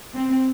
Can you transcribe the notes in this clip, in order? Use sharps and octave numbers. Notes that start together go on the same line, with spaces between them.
C4